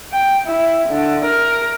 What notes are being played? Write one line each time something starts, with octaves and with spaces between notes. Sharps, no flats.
G5
E4
D3
A#4